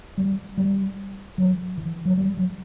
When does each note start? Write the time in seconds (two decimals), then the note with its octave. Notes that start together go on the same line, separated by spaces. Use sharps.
0.18 G3
0.57 G3
1.38 F#3
1.78 E3
2.05 F#3
2.17 G3
2.37 F#3